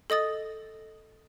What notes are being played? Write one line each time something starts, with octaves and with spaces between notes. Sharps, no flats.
A4 D#5 D#6 A6